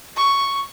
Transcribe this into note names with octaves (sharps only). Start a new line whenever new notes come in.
C#6